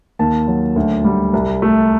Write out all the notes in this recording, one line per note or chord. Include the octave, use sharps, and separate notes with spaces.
D#2 A5
F#3
D2
G3
C2
A3